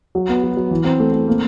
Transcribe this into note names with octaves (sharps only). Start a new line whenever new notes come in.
F#3
B3
F#3
F#3
E3
C4
A3
C4
A#3